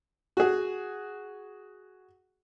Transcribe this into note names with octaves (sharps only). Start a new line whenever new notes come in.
F#4 G#4